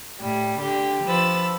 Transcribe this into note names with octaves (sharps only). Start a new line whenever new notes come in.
A2 G3
D3 G4
F3 B4 E6 A6